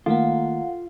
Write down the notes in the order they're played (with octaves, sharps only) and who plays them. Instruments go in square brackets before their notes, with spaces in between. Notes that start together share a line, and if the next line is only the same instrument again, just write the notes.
[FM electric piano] D#3 A3 A#3 [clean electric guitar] F4 [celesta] A4 F5 F#5